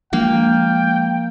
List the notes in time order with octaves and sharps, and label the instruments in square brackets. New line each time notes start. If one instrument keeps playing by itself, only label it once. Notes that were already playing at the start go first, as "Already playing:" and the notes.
[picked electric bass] F3 G#3 D4 [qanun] A#3 [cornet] G5